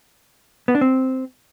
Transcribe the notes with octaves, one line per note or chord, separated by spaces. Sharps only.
B3
D4
C4